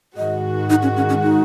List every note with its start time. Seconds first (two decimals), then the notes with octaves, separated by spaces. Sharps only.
0.17 G#2 D#3 G#3 F#4 D#5
0.70 D#4
0.83 C#4
0.97 C#4
1.09 C#4
1.23 D#4